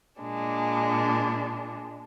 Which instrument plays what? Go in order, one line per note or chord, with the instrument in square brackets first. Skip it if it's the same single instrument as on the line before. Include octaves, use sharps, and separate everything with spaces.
[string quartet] A#2 G#3 D4